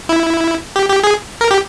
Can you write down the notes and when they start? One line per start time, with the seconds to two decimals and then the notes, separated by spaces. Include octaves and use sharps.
0.09 E4
0.76 G4
0.89 G4
1.04 G#4
1.41 A#4
1.51 G4